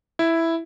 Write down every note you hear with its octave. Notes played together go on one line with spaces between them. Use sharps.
E4